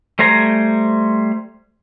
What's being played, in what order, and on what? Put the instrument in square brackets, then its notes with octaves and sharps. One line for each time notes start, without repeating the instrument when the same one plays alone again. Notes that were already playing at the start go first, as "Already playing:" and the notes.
[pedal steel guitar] G3 A3 C5 G#5 A#5